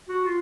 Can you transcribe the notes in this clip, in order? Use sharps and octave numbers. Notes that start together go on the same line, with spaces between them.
F#4
F4